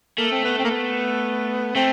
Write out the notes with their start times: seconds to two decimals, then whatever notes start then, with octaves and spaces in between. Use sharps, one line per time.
0.18 A3 A#3
0.31 C4
0.44 B3
0.58 C4
0.64 A#3
0.70 B3
1.75 A3 C4